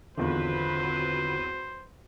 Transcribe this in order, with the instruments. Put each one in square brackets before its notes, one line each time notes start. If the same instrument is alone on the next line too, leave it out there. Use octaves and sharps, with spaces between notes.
[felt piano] G#1 E2 [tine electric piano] D3 F4 [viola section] F#3 C4 B4 [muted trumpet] C5